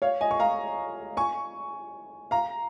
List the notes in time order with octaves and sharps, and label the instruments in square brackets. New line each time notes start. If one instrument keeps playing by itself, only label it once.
[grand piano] C#5 F5
D#5 G#5
C#6
F5 A#5
G#5 C#6
F5 A#5